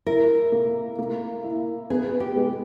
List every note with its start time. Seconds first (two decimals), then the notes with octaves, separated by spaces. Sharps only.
0.07 E4 A#4
0.52 A#3
0.99 A#3
1.44 E4
1.90 B3 G#4
2.20 G4
2.36 G#3